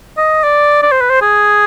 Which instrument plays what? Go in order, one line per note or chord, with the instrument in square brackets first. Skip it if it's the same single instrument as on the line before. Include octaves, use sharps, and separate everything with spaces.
[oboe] D#5
D5
D5
C5
B4
C5
G#4